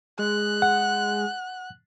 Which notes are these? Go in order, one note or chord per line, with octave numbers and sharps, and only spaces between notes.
G#3 F#6
F#5